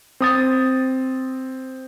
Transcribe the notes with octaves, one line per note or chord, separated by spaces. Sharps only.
C4 D#6 A6